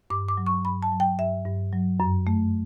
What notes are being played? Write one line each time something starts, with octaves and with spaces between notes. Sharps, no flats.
G2 D6
D6
F#3
C#6
G2 B5
A5
F#3
G5
G2 E5
G2
F#3
F#2
A3